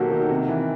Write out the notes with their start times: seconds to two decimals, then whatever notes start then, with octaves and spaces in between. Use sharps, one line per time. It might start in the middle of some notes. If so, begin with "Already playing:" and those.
Already playing: B2 D#3 F#3 A#3 F#4 G4 A4
0.11 D#3
0.30 C3
0.48 E3